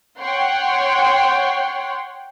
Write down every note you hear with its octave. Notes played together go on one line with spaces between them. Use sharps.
C#5 F#5 G5 C6